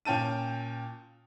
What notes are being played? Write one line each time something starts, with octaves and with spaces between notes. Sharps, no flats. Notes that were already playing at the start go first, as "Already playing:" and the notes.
A#2 C#4 G5 A5 D#7